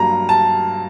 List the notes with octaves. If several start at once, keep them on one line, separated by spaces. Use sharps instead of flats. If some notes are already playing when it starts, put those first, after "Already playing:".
Already playing: G2 F#3 A#3 A#5
A5